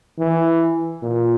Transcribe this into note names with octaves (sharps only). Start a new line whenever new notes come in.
E3
A#2